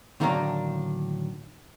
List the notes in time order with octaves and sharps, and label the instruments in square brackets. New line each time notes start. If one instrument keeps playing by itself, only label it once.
[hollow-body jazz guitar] A2 D3 D#3 F#3 A#3 D4